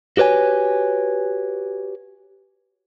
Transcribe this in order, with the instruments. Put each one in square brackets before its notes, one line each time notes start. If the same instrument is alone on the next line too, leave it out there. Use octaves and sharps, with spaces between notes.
[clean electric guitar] F#4 G4 B4 C#5 G#5